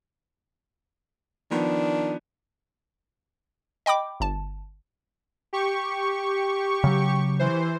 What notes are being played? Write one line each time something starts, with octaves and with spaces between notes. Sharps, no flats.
D#3 F3 B3 D4
D#5 G5 B5 D6
G1 A5
G4 C#6
C#3 F#3
E3 C5